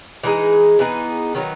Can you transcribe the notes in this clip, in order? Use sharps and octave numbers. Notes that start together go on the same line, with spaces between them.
E3 G#3 D#4 G#4
E3 B3 D#4 G#4
D#3 F#3 B3 D#4